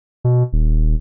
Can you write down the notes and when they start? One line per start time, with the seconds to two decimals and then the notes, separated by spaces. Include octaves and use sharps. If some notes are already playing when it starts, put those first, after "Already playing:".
0.24 B2
0.53 D#1